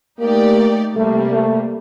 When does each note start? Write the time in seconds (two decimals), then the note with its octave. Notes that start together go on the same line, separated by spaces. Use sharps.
0.19 A3 A#3 D#4 G4 D5
0.95 C3 G3 A3 A#3
1.34 A3